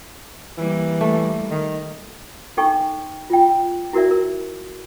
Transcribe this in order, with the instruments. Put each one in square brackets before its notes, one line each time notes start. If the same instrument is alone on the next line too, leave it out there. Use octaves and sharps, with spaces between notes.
[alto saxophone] E3 [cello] G3 A#3
[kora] A3
[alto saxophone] D#3
[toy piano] D4 D#4 A4 G5 C#6
F4 G5
E4 F#4 A#4 D5 E5
A#4